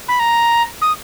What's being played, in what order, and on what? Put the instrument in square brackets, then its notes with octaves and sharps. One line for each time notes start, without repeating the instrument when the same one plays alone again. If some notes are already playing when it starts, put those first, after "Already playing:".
[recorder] B5
A#5
D#6